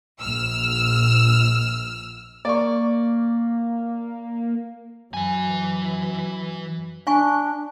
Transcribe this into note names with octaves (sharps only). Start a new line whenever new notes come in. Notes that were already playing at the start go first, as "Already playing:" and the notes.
A#1 E6 F6
A#3 D5 C#6
F#2 E3 G#5
D4 C#5 G#5 C#6